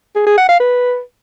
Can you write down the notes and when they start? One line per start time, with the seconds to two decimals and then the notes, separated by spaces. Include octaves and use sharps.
0.15 G#4
0.27 G#4
0.38 F#5
0.49 F5
0.60 B4